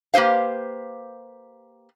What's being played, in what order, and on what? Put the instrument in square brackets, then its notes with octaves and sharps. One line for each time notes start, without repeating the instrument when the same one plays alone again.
[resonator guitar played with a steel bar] A#3 G4 B4 C5 F5